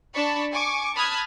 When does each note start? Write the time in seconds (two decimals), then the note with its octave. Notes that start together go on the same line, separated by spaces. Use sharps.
0.14 D4 A5 B5 C#6
0.54 G#5 C#6 D6
0.95 A5 B5 D#6 F6 F#6 G#6